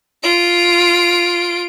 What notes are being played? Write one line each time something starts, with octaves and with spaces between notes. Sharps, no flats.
F4 D7